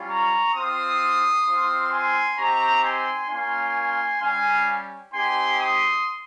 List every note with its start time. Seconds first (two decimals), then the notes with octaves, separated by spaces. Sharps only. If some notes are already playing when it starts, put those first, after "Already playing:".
Already playing: G3 C#4 F4
0.09 A#5 C#6
0.54 C4 F4 C6 D#6
1.46 C4 F4
1.91 G#5 C6
2.37 C4 D#4 G4 A#5 C#6
2.83 G#5 C6
3.29 A#3 C#4 F4 G#5 C6
4.21 G3 C#4 G4 F5 G#5
5.12 C4 D#4 G4 G#5 C6
5.58 C6 D#6